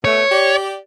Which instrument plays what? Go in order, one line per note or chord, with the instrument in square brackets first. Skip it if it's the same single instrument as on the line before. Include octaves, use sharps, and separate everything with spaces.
[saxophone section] B2 A3 [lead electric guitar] C#5
[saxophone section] G4 D5